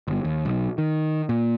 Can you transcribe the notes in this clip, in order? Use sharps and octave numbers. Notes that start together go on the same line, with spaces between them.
G1
D#2
B1
D#3
A#2